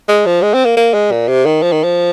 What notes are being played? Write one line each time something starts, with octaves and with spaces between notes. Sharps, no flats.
G#3
F3
G#3
C4
A#3
A#3
G#3
A#2
C3
D#3
F3
D#3
F3